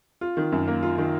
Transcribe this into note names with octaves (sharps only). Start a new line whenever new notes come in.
F4
D#3
F#2
A#3
F4
D#3